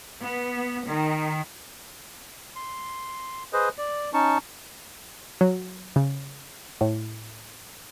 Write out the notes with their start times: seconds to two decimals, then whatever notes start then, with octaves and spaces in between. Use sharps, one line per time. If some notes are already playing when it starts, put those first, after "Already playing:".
0.23 B3
0.87 D#3
2.56 C6
3.53 G#4 B4 C5 D#5
3.78 D5
4.14 C#4 D#4 A5 C#6
5.41 F#3
5.96 C#3
6.81 A2